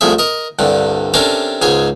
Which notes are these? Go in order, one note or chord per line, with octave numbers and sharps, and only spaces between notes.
C2 A2 F3 G#4 E5
A#4 D#5
C2 G2 D3
C3 C#4 D4 A4 A#4 C5
C#2 G#2 C5 C#5 G#5